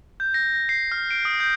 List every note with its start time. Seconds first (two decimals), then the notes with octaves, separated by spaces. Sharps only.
0.20 G6
0.34 A#6
0.54 A#6
0.69 C7
0.92 F6
1.11 D7
1.25 D#6
1.40 G6